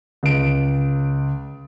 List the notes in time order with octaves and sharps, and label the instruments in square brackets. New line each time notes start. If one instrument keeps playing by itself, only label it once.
[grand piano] C#2 D7